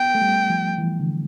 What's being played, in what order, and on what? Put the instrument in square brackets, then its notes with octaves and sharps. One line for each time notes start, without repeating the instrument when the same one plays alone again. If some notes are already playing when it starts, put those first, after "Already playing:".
Already playing: [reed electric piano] B3 [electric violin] G5
[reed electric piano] A3
G3
F3
E3
D3